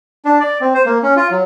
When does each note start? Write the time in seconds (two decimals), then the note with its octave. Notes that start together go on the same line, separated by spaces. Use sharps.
0.25 D4
0.40 D5
0.61 C4
0.74 C5
0.86 A#3
1.03 C#4
1.16 F4
1.31 F#3